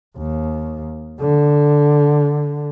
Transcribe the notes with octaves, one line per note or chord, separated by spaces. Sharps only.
D#2
D3